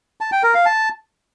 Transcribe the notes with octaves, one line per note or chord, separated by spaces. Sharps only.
A5
G5
A#4
F5
A5